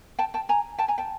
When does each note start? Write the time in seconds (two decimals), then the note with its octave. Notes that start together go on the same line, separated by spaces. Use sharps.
0.19 G5 A5
0.34 G5 A5
0.49 G#5 A#5
0.78 G5 A5
0.88 G#5 A#5
0.98 G5 A5